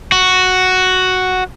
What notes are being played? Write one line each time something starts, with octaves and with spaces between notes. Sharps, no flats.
F#4